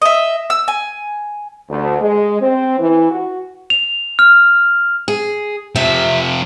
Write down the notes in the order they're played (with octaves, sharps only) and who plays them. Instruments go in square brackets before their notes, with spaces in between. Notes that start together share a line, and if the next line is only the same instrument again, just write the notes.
[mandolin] D#5 E5
E6
G#5
[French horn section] D2
G#3
C4
E3
F#4
[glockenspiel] F7
F6
[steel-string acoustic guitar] G#4
[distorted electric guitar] C3 F3 [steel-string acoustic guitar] E5